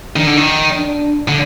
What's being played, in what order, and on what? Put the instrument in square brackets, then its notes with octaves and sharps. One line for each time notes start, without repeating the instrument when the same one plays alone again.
[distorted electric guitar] D#3 [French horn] D4
[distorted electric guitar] D3
D#3
[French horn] D4
[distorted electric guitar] D3